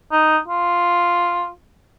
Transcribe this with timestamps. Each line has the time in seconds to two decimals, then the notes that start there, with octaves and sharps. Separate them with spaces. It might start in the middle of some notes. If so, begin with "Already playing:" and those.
0.12 D#4
0.48 F4